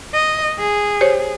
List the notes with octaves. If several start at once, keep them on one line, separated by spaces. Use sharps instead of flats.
D#5
G#4
G4 C5 C#5